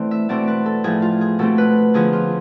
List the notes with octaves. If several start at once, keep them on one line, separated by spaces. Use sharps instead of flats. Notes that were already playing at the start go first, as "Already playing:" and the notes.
Already playing: E3 A3 C4 D5
E5
B2 A3 C4 D5
B4
A4
A2 F3 A3 G#4
F4
G#4
B2 A3 C4 A4
B4
D3 F3 B3 G#4
F4